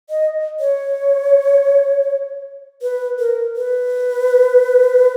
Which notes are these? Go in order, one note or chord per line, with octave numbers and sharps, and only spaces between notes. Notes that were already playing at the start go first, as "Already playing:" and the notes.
D#5
C#5
B4
A#4
B4